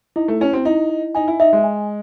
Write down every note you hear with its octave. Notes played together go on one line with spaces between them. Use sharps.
D#4 E4
A3
C#4 E4
C4
D#4 E4
D#5
D#4 G#5
E4
D#4 E5
G#3
G#5